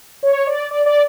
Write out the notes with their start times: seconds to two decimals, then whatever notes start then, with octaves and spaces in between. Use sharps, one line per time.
0.23 C#5
0.47 D5
0.71 D5
0.86 D5